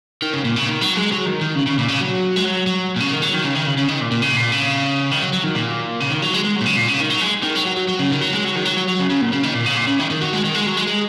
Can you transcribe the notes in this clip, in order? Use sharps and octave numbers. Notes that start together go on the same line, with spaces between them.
D#3
C#3
A#2
C#3
D#3
F#3
G#3
F#3
D#3
D#3
C#3
C#3
A#2
C#3
F#3
G#3
F#3
F#3
A#2
C#3
D#3
F#3
D#3
C#3
D#3
C#3
C#3
D#3
A#2
A#2
C#3
A#2
C#3
D#3
F#3
F#3
D#3
A#2
C#3
D#3
F#3
G#3
G#3
F#3
A#2
C#3
A#2
C#3
D#3
F#3
G#3
D#3
F#3
F#3
F#3
F#3
C#3
D#3
F#3
G#3
F#3
D#3
F#3
F#3
F#3
C#3
C#3
A#2
C#3
D#3
A#2
C#3
A#2
C#3
D#3
D#3
F#3
G#3
D#3
G#3
F#3
G#3
G#3